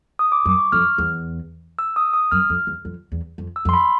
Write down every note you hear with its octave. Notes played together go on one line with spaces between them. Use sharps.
D#6
D6
F#2
D6
C#6
F2 F6
E2
E6
D#6
D#6
F#2 F6
F2
E2
F2
E2
F2
E6
F2
C6
B5